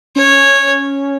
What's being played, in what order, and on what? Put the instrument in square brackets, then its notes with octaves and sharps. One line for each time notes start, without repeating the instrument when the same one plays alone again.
[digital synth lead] C#4 [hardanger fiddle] C#5